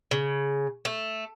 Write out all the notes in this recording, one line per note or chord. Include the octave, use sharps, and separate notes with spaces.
C#3
A3